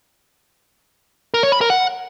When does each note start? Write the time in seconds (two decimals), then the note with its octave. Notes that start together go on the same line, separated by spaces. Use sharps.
1.34 A#4
1.43 C#5
1.52 B5
1.61 A#4
1.70 F#5